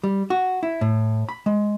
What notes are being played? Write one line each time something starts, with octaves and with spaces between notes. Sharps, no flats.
G3
F#4
E4
A2
B5
G#3